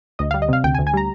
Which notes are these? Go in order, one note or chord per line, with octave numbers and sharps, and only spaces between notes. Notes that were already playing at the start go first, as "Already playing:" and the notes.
D2 D#5
G3 F5
D#5
C3 F5
D2 G5
G#5
D2
G#5
G3 A#5